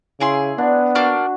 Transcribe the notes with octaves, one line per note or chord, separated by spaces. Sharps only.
C#3 E4 G#4 C6
B3 D4
A#3 D4 F#4 F6